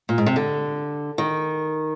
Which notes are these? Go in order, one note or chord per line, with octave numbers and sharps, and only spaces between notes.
A#2
G#2
C3
D3
D#3